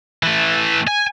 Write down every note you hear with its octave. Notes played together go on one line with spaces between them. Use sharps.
E3 A3
G#5